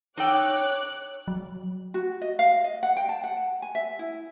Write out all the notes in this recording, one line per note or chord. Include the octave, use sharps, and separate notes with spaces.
D#4 A4 C#5 G5 D6 F#6
F#3
F#4
D#5
F5
D#5
F#5
G5
A5
F#5
G#5
E5
E4